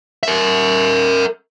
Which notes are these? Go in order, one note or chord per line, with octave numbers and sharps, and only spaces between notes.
A#4 E5